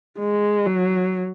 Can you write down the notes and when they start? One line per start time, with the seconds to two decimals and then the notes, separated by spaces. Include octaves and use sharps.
0.19 G#3
0.66 F#3